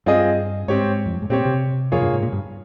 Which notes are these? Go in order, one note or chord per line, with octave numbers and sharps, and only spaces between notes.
G2 C4 F4 G#4 D#5
G#2 C4 G4 C#5
F2
G2
G#2
A#2 C4 G4 C#5
C3
F2 A#3 F4 G#4 C#5
G2
G#2
A#2
G2